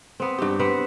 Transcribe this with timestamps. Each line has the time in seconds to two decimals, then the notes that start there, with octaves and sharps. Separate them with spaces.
0.20 B3 C4
0.38 G2 G4
0.59 B3 C4 B4 F#5